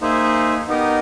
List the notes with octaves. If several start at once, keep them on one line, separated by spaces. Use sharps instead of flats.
A#3 D#4 G#4 C5 E5
B3 D#4 G4 A#4 D#5